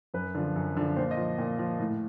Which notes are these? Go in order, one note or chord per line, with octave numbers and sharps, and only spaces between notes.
F#2 B4
D3 F3
F#2
D3 F3
A#2 C5
D#5
F3
A#2
F3
A2